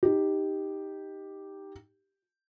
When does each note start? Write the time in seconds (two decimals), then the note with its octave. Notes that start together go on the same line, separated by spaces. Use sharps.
0.03 D#4 G4